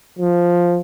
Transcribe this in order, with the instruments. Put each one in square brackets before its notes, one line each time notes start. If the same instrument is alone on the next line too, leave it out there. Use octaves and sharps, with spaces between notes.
[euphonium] F3